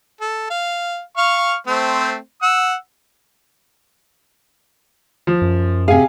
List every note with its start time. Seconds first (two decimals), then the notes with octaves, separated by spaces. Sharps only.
0.21 A4
0.50 F5
1.17 F5 C#6 F6
1.67 A3 C4 C5
2.42 F#5 E6
5.27 F3
5.41 F#2
5.88 C3 G#4 F5 G#5